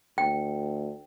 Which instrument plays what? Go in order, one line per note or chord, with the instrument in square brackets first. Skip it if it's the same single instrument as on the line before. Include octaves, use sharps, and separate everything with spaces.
[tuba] D2 [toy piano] G5